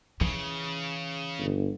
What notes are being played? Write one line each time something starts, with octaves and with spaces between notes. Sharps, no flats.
C#3 E3
G1